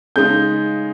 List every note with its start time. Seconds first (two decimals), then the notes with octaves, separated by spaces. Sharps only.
0.16 C#3 G#3 D#4 G6